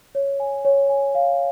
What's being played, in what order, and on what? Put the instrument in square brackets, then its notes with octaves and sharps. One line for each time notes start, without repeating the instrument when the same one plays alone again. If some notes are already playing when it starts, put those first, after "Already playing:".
[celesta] C#5
G#5
C#5
G#5
F5